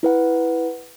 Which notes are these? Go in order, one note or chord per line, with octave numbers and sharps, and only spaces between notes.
E4 B4 F#5